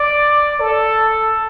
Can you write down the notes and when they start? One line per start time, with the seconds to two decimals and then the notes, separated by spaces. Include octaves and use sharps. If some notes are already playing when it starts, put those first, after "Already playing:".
Already playing: D5
0.61 A4